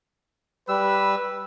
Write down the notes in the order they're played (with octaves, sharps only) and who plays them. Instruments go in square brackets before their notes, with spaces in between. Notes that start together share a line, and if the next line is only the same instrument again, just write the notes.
[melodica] G3 E6 [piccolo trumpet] B4